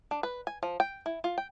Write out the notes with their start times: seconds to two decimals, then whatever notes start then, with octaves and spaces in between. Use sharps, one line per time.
0.11 D4
0.23 B4
0.47 G#5
0.63 F3
0.80 G5
1.06 E4
1.24 F4
1.38 G5